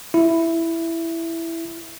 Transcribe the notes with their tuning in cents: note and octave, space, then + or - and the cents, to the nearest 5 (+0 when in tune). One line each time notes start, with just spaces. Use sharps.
E4 +5